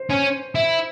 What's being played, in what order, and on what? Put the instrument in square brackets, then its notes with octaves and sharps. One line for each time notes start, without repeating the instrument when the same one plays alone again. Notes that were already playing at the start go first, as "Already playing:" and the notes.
Already playing: [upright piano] C5
[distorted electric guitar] C#4
E4